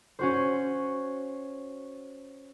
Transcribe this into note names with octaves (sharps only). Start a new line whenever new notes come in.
C#4 F#4 C5